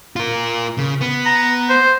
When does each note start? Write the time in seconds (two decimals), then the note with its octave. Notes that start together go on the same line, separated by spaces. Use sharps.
0.16 F4 A#4
0.78 C#3
1.01 B3
1.26 A#5
1.69 C5